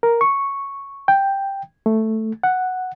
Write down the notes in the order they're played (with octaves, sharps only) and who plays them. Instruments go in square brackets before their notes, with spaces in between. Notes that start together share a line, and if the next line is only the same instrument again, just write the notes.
[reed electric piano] A#4
C#6
G5
A3
F#5